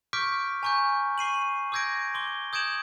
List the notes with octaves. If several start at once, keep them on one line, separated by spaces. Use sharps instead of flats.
C#6 D6 F6 G6 B6 D7
G#5 A#5 C#6 F6 G6
C#6 C7 D#7 F#7
D6 E6 G6 G#6 A#6 D7
C6 D6 G7
D#6 G6 G#6 D7 E7 F#7